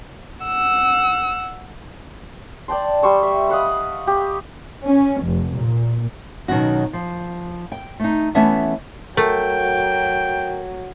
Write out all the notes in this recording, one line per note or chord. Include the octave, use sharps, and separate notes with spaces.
F#5 E6
D5 G5 A5 C6
G3 C6 C#6 E6
E5
D#5 F5 F#5 B5
G4
C#4
F1
A#2
B2 D#3 F#3 C#4 F#4
F3
G5
A3 D#4
E3 A3 B3 C#4 E5 A5
F#3 A3 A#4 G5